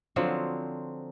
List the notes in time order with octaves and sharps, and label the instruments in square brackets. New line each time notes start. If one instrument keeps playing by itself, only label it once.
[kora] D3 F3 F#3 C4